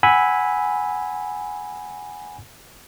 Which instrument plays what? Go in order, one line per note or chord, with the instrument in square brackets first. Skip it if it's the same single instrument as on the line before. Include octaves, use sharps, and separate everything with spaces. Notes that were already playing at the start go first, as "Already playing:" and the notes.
[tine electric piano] F#5 G#5 B5 E6